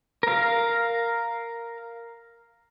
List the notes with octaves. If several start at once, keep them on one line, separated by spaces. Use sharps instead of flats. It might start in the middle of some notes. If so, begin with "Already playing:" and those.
A#4 F5